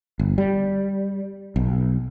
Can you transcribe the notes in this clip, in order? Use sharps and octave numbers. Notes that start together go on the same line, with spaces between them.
G1
G3
B1